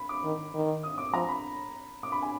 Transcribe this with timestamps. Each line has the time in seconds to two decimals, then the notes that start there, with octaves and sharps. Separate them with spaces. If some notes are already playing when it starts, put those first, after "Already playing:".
Already playing: B5
0.09 D6
0.24 D#3
0.54 D#3
0.83 D#6
0.98 D6
1.13 F3 A#5
1.29 B5
2.03 D6
2.12 B5
2.22 G#5